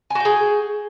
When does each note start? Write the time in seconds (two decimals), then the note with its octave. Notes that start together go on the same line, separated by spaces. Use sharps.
0.10 G#5
0.15 F#4
0.20 G5
0.25 G#4